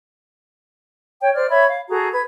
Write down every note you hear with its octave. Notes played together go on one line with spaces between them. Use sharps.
C#5 G5
C5 D5 F6
C#5 E5 B5
F5
F#4 G#4 A4 A#5
B4 G#6